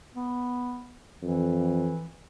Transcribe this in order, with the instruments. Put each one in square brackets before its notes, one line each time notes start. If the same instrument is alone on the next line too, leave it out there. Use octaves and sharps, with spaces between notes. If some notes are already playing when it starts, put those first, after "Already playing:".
[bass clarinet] B3
[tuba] F2 [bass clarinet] E3